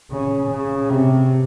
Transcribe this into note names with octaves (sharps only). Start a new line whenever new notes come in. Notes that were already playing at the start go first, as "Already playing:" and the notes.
C#3
C#3
C3